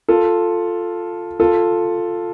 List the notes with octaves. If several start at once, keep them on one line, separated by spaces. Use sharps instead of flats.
F4 A4
F4 A4